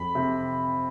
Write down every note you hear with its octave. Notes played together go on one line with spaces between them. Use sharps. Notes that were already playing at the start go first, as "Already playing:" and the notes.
Already playing: F2 B5
C3